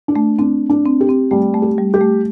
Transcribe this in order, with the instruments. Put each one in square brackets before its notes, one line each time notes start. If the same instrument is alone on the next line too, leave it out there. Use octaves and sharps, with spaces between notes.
[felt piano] D4
[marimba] A3
[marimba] C4 [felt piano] D4
[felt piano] D4
[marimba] C4
[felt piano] G4
[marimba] C4
[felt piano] G3 [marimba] A3
[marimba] A3
[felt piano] G4
[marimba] G3
[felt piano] G4
[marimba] A3